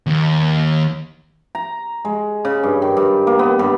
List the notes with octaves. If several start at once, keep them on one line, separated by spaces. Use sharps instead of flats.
D#2
A#5
G#3
C#3
G2
D#3
G2
A#3
B3
G2